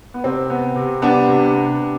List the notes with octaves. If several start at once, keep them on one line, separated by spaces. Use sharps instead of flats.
B3
C3 C4
B3
C3
G3 B3 D4
C3
B3
C3